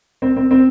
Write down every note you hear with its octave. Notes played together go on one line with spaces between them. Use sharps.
C4
C4
C4